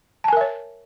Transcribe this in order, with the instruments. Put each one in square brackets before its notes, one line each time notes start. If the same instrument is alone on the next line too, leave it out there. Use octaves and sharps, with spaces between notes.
[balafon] A5
G#5
A#4
E5
C#5